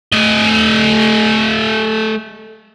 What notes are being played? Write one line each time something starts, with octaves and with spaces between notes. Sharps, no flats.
A3 D#5